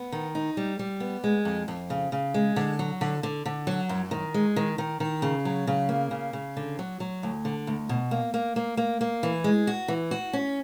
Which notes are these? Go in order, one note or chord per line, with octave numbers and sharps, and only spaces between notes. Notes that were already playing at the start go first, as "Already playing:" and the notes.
Already playing: B3
D#3
D#4
G3
G3
B3
G#3
F2
F2
C#3
C#3
G#3
D3
F#3
D3
D3
D3
F#3
F#2
D#3
G#3
D#3
D#3
D#3
C#3
F#3
C#3
A#3
C#3
C#3
D3
F#3
F#3
D2
D3
D2
B2
A#3
A#3
A#3
A#3
A#3
E3
G#3
F#4
E3
F#4
C#4